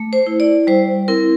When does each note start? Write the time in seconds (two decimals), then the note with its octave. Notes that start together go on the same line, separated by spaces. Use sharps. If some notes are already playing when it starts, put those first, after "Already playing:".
Already playing: A3
0.13 C5
0.27 E4
0.40 D5
0.67 G3 C5
1.08 C4 E4 A#4